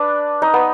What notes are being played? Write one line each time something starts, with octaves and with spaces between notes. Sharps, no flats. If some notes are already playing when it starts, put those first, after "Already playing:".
Already playing: D4 B4 D5
D#4 D#5
B3 B4